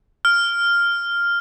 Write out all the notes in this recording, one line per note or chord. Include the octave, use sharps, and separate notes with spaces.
F6